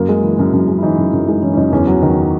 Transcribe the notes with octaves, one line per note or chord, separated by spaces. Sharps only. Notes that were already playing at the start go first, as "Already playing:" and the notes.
Already playing: F#2 A#3
G#3
E3
F#2
F#2
G#3
E4
E3 D#4
F#2
F#2
G#3 D#4
E3 C#4
C#4
F#2 D#4
E2 C#4
F#3
D#3